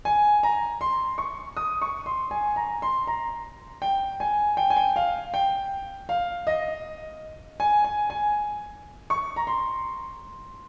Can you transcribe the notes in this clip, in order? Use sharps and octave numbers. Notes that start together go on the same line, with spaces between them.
G#5
A#5
C6
C#6
D#6
C#6
C6
G#5
A#5
C6
A#5
G5
G#5
G5
G#5
G5
F5
G5
F5
D#5
G#5
G#5
G#5
C#6
A#5
C6